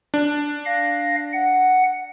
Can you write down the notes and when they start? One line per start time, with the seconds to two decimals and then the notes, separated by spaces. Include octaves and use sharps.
0.14 D4
0.65 F5 A#6
1.33 F#5